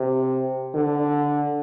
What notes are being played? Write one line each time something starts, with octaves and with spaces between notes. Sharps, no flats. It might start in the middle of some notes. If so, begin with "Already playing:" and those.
Already playing: C3
D3